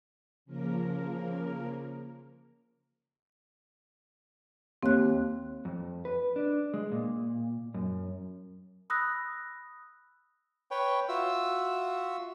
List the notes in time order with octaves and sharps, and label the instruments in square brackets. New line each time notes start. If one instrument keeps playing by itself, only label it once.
[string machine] C#3 F3 A#3 A#4
[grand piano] D#2 [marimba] C4 F#6
[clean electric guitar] F2
B4
D4
G#3
A#2
F#2
[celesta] B5 D#6 E6 F#6 A#6
[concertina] B4 C#5 G5
F4 F#4 E5 E6